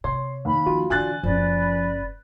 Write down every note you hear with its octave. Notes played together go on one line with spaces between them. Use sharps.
C3 C#5 C6
D#2 B5
F3 F4 F#4
D3 E3 D4 G#5 F#6 A6
F#1 F3 C#4 B4 D5